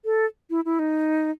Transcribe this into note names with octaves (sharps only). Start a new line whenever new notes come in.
A4
E4
E4
D#4